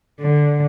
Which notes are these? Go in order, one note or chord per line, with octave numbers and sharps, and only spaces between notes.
D3